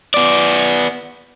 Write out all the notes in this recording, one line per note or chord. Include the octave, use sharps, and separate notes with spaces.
B3 D5